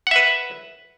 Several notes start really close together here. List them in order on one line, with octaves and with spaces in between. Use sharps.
F#5 E5 B4